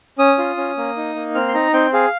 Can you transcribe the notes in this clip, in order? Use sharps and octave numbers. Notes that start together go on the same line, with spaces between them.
C#4 D#6
F4
C#4
A#3
D#4
A#3
C4 F6
C6
D#4 A#5
C4 G5
G#4 F5